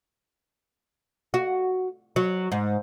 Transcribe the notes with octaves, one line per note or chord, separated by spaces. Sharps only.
F#4
F#3
G#2